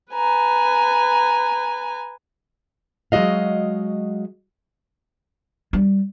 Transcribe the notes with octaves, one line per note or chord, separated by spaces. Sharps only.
B4 G#5 A#5
F#3 G#3 F#4 D#5 F5
G3